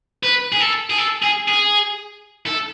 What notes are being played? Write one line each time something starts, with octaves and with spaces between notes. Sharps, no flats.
B4
G#4
A4
G#4
A4
G#4
G#4
A4